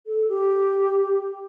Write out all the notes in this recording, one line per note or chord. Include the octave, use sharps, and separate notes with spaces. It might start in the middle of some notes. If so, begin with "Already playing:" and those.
A4
G4